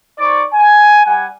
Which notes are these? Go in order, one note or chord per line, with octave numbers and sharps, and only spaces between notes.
D#4 C5 D5 C#6 D6
G#5
G3 F#5 G#5